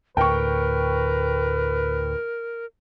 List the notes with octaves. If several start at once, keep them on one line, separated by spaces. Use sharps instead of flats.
D2 A2 A#4 B4 G5 C#6